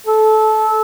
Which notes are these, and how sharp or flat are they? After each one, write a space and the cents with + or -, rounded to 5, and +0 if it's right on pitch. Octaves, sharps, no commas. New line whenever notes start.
A4 -20